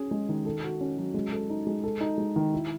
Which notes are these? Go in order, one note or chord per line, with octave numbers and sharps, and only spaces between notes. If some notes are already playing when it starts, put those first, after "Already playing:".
Already playing: C#4 G#4
G#3
D#3
A4
F#4
C#4
F#3
G#3
A4
D#4
G#3
A4
D#4
G#3
D#3
E4